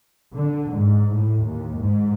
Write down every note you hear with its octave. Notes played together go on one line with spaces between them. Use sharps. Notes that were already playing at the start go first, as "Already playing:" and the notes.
D3
G#2
A2
D#2
G#2